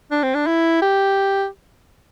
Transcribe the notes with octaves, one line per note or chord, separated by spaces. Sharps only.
D4
C4
D4
E4
G4